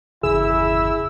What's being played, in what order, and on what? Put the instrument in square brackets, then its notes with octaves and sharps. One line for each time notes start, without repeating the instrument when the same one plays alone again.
[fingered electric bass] G1 E2 C#3 [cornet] E4 [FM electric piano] G#4 [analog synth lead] E6